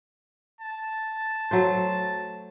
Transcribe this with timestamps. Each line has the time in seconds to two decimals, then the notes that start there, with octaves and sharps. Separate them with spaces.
0.61 A5
1.51 F#3 A3 C5